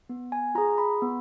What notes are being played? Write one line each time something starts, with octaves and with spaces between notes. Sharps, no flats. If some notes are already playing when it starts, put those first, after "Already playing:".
B3
G#5
F4 G#4 A#5
B5
B3